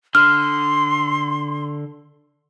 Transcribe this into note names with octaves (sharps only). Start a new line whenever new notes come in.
D3 C6 F6